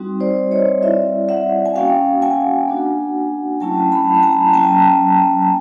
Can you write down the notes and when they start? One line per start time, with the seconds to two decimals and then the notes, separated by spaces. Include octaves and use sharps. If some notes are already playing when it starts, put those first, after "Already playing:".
Already playing: G3 C4 D#4 F#4
0.20 C5 D5
0.51 C#5 D#5
0.82 G3 C4 E4 D5 E5
1.29 E5 F#5
1.65 G#5
1.75 A#3 C#4 F#4 F5 G5
2.22 F#5 G#5
2.68 A#3 D4 F#4
3.60 F#3 A3 C#4 E4 G5 A5
3.92 A5 B5
4.14 A5
4.23 G#5 A#5
4.48 A#5
4.53 F#3 A#3 C#4 G5 A5
5.42 G#5